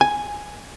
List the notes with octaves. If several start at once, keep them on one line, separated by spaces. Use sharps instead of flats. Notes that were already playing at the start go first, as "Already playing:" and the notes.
G#5